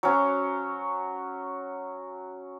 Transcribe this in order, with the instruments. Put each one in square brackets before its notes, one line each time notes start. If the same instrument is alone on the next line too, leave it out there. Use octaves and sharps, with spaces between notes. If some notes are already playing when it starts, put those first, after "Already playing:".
[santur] F#3 C#4 F#4